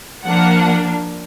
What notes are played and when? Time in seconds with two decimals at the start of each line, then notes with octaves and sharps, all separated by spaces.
0.25 F3 A#3 D4 F#5